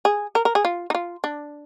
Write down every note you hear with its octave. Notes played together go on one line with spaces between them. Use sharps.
G#4
A#4
A#4
G#4
F4
D#4
F4
D4